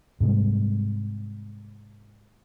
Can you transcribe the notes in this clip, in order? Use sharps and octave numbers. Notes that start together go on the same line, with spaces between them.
G#2 C3 G3 G#3